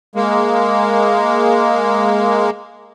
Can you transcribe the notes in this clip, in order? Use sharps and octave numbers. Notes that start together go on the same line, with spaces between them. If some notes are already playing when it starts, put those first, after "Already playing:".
G#3 A#3